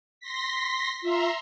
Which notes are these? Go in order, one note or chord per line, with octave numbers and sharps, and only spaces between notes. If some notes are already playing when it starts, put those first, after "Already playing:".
C6 A#6 B6
F4 E5 A#5 C6